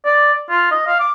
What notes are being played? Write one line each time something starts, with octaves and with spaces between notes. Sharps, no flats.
D5
F4
D#5
F5
D6